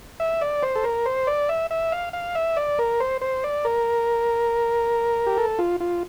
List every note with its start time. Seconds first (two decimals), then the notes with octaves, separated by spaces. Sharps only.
0.20 E5
0.41 D5
0.63 C5
0.75 A4
0.84 A#4
1.06 C5
1.27 D5
1.49 E5
1.71 E5
1.92 F5
2.13 F5
2.35 E5
2.57 D5
2.79 A#4
3.00 C5
3.21 C5
3.44 D5
3.65 A#4
5.27 G4
5.38 A4
5.59 F4
5.80 F4